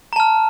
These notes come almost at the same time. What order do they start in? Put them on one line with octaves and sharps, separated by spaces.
A#5 A5 F6